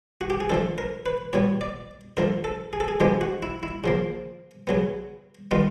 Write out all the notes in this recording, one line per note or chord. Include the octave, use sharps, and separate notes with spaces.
F#4
G4
G#4
D3 F3 A3 A4
A#4
B4
A#2 G3 B3 C#5
D5
D3 F3 A3 A#4
A4
G#4
A4
G#4
D3 F3 G#3 B3 G4
F#4
E4
E4
C#3 F3 A#3
C#3 F#3 B3
D#3 G3 B3 F4